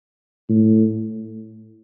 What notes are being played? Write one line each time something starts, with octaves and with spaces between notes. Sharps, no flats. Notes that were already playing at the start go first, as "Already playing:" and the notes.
A2